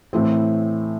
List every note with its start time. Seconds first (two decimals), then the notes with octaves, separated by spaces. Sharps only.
0.13 A2 E3 A3 C4